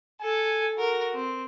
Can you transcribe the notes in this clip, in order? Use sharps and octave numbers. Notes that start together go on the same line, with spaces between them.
A4 G#5
F#4 A#4
C4